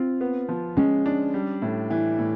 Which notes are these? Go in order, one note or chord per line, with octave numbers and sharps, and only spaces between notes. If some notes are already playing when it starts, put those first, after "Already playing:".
Already playing: C4 F4
B3
F3
G#3 C#4
D4
G3
A2
E3
A2